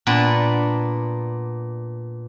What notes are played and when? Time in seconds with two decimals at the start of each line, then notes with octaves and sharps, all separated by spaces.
0.07 A#2 B3 D4